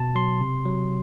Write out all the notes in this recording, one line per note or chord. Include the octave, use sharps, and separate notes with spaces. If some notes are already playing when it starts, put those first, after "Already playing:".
Already playing: B2 A5
F#3 C6
C3
F#3